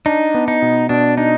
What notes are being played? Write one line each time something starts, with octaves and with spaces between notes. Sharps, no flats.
D4 D#4
B3
D#4
B2
B2 D4
D4 D#4